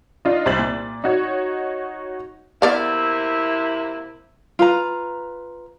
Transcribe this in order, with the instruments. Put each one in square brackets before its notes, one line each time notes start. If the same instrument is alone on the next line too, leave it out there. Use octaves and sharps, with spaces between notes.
[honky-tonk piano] D4 D#4 F4 D#5
C2 C5 A6 F#7
A#2
D#4 F#4 C#5
[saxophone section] C3 A#3 E4 [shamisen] B3 D5 F5
[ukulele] F4 B4 A#5